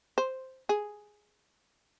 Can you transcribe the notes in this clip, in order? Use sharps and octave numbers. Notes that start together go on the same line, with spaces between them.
C5
G#4